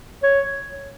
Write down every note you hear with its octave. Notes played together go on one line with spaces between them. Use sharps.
C#5